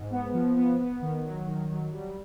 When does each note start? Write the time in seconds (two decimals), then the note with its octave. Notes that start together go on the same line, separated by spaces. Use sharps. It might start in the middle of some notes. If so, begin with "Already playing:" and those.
Already playing: G#2
0.11 B3
0.33 F3
0.56 B3
0.79 B3
1.01 D#3
1.24 F#3
1.46 D#3
1.69 F#3
1.92 G3